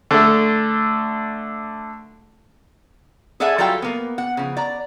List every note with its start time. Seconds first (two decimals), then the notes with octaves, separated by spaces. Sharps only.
0.11 D3 A3
3.40 G#4 A4 D5 E5 F#5 G#5
3.58 F#3 G3 F4 A4 F5 G5
3.82 A#3 B3
4.18 F#5
4.37 C#3 F3
4.57 D5 A#5